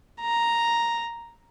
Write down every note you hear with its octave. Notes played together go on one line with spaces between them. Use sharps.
A#5